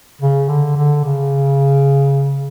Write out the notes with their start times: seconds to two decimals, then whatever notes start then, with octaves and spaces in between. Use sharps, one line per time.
0.21 C#3
0.49 D3
0.77 D3
1.04 C#3